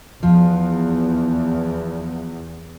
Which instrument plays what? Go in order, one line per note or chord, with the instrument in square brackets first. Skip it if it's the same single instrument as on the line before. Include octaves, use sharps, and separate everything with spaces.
[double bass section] E2 [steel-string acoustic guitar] F3